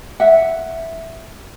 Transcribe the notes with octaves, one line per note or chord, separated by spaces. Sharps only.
E5 F#5